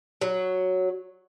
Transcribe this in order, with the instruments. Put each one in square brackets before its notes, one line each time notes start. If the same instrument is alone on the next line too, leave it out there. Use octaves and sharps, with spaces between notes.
[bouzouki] F#3